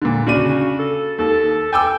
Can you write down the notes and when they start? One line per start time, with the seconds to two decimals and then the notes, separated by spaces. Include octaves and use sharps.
0.02 A#2 D3
0.26 C#3 D4 F#4 D#7
0.79 A4
1.18 D#2 A4
1.73 G5 G#5 D6 E6